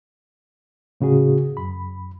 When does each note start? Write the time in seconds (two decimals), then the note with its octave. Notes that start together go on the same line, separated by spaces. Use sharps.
1.01 A2 C#3 F#4 G#4
1.57 F#2 B5